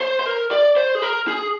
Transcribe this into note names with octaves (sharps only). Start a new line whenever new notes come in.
C5
C5
A#4
D5
C5
G#4
A#4
G#4